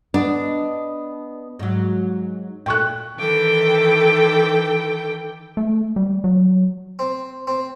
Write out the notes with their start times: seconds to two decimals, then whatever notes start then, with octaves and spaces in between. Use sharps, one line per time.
0.14 B3 D4 D#5
1.59 G#2 F#3
2.66 A#2 A3 G5 C#6 F#6
3.18 D#3 E3 A4 G5 D6
5.57 A3
5.96 G3
6.24 F#3
6.99 C4
7.47 C4